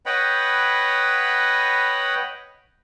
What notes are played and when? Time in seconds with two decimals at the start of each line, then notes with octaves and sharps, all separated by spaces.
0.06 B4 C#5 D#5 F#5 G5 B5